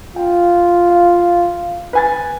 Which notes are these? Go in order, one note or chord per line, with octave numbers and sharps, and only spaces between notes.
F4 G5
F5
B4 G#5 A6